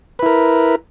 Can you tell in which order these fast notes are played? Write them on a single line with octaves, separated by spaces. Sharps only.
B4 E4 A#4